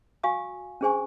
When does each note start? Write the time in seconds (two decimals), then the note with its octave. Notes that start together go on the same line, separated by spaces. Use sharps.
0.24 F#4 F5 G#5 C#6 D#6
0.81 C#4 D4 G#4 C5 G#5 C#6